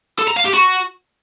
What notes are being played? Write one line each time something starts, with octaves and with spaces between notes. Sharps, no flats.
A4
A#5
F5
G4
F#4